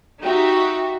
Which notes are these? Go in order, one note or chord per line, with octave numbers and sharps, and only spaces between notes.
D#4 F#4 G4 E5